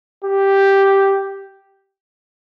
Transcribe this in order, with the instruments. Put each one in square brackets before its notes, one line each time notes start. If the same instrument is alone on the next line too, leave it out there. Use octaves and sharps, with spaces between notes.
[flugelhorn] G4